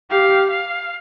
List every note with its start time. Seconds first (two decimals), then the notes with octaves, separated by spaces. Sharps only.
0.11 G4 F5
0.50 F5